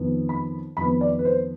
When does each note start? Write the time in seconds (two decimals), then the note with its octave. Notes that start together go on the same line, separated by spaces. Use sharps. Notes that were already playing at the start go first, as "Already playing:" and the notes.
Already playing: F2 D#3 B3
0.29 B5
0.77 F2 D#3 B3 B5
1.01 D5
1.19 B4
1.25 C5